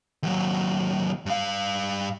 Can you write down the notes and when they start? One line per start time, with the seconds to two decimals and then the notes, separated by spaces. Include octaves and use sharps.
0.23 D#2 F#3
1.26 G2 F5